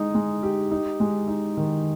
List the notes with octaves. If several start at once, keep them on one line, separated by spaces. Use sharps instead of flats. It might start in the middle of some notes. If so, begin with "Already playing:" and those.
Already playing: G#3 D#4
G#3
G4
D#4
G#3
D#4
D#3